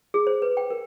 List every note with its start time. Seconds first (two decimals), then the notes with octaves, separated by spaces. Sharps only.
0.14 G#4
0.27 C5
0.42 B4
0.57 G5
0.70 A#4